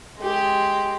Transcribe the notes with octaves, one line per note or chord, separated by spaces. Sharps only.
G#3 G4